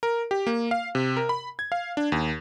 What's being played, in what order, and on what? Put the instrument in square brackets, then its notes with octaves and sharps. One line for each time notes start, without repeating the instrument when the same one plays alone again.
[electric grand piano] A#4
G4
A#3
F5
C3
A#4
B5
G#6
F5
D4
D#2